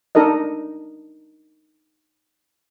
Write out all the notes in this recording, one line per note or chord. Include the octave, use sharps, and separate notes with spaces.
D4 D#4 A4 A#4 D#5